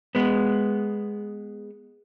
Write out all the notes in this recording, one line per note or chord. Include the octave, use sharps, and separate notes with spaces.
G#3 B3